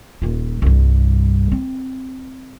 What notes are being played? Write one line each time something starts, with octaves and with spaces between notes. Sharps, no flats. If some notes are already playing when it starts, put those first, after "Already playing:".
D#1 F4
C2 G2
C4